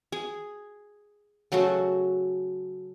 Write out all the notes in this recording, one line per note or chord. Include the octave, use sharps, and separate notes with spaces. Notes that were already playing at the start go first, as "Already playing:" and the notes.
G#4
C#3 F#3 A3 F#4